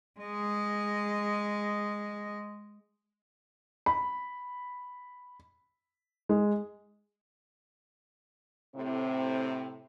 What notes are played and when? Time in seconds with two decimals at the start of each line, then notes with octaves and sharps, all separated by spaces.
0.20 G#3 D#5
3.86 B5
6.29 G#3
8.75 A2 C3 C4